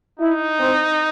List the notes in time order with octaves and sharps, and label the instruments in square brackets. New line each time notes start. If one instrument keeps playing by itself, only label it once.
[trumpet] D#4 [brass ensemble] E4
[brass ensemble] C4